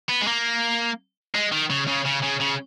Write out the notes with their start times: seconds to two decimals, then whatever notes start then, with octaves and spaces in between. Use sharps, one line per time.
0.09 B3
0.21 G#3
0.27 A#3
1.34 G#3
1.52 D#3
1.70 C#3
1.88 C#3
2.06 C#3
2.23 C#3
2.41 C#3